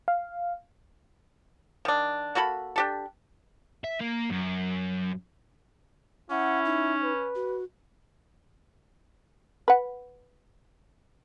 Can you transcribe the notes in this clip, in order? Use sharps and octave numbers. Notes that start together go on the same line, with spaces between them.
F5
D#3 D4
A#3 F#4 A4 B5
D4 G4 A4
E5
A#3
F#2
C#4 E4 F#5
D#4
B4
F#4
B4 F#5